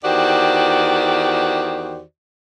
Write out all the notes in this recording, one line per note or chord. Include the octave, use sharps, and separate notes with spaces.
E2 D#3 F#4 G4 C5 D5